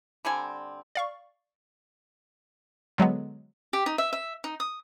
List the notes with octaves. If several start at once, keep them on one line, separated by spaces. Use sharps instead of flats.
D3 G3 C4 G#5
D5 F5 C#6
D3 F#3 G#3 B3
G4
D#4
E5
E5
D#4
D#6